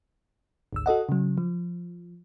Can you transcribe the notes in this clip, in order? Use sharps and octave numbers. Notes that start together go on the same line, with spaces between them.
G#1 D2 E6
F#4 A4 D#5 F#5
C#3 F#3
F3